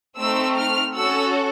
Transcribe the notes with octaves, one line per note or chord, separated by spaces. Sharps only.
A3 C4 D#4 E6
F6
C#4 F#4 A4 E6